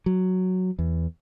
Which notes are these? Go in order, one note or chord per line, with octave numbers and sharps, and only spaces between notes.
F#3
E2